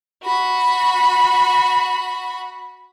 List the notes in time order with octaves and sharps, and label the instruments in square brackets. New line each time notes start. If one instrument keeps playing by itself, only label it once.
[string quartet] F#4 B5